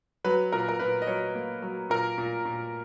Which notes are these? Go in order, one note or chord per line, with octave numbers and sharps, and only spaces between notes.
F#3 B4
A#2 A#4
A#4
A#2 B4
D#5
F#3 C#5
A#3
F#3
A#2 A#4
A#2
A#2